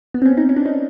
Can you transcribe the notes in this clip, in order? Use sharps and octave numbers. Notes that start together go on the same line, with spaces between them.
B3
C4
C#4
D#4
C#4
D4
D#4